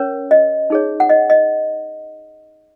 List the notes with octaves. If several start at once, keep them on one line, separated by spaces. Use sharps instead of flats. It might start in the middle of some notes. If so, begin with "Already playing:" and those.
Already playing: C#4 A#4 C#5
D#5
D#4 G#4 C#5
F#5
D#5
D#5